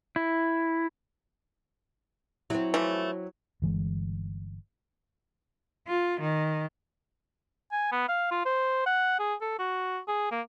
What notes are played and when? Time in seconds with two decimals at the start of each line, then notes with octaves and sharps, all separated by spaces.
0.16 E4
2.50 F#3 C4 E4
2.74 E3 F3 A3
3.62 G1 E3 G#3
5.87 F4
6.21 D#3
7.72 G#5
7.92 B3
8.08 F5
8.31 F4
8.45 C5
8.86 F#5
9.19 G#4
9.41 A4
9.59 F#4
10.08 G#4
10.31 A#3